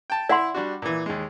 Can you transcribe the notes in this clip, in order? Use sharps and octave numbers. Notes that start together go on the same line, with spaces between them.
G5 A5
E4 D5 E5 F#5 C6
G3 D4 F#4
A#2 E3
D#2 G#3